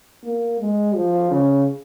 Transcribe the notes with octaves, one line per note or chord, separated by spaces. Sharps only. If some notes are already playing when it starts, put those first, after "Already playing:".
A#3
G#3
F3
C#3